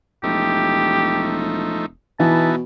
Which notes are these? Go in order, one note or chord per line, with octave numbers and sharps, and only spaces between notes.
E1 F3 A3 D#4 G4
B2 E3 B3 D#4 E4 A5